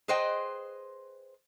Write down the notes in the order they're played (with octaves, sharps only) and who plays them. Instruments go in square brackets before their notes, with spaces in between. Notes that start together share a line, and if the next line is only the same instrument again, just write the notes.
[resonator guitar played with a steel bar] G#4 B4 C5 D#5 G5